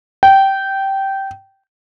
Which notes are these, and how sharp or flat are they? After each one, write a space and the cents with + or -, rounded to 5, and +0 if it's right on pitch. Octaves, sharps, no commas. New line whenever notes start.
G5 -15